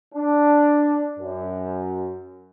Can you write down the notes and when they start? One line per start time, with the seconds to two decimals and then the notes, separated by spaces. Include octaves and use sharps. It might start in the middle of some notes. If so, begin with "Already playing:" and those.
0.14 D4
1.19 F#2